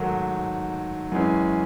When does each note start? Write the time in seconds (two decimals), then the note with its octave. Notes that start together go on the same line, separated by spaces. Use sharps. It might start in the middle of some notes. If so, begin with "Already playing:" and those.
Already playing: G#2 D#3 F#3 A3
1.12 F#2 E3 G#3 C#4